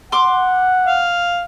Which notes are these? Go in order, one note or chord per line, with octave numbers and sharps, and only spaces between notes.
F#5 C6 D6
F5